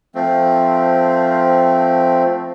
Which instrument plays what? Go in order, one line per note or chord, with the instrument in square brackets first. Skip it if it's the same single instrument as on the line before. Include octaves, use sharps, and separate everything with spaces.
[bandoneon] F3 A3 C4